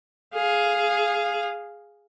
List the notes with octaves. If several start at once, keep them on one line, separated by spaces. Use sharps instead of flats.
G#4 F5